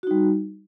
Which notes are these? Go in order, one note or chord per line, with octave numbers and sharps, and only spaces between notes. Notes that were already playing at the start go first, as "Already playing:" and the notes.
G3 D#4 F#4